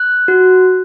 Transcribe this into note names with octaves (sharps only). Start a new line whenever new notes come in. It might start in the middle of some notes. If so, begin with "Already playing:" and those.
Already playing: F#6
F#4